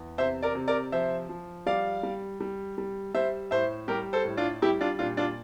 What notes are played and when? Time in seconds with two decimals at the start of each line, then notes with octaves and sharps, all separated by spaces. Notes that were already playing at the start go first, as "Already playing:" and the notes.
Already playing: E2
0.18 C3 C5 E5
0.43 A#4 D5
0.55 C3
0.68 A#4 D5
0.92 F3 C5 E5
1.29 F3
1.66 G3 D5 F5
2.03 G3
2.40 G3
2.78 G3
3.14 G3 C5 E5
3.51 A2 C5 E5
3.88 G3 G4 A#4
4.13 A4 C5
4.25 A2
4.37 D4 F4
4.62 G3 E4 G4
4.81 D4 F4
4.99 A#2 D4 F4
5.17 D4 F4